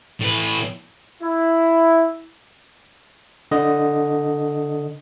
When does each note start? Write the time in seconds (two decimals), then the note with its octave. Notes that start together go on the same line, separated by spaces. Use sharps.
0.21 A2 B4
1.22 E4
3.51 D3 D#5